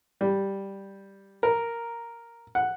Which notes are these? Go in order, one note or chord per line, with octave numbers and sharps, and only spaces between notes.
G3
A#4
F#5